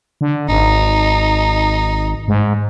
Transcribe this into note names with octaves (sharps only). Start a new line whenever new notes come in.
D3
G#1 D#4
G#2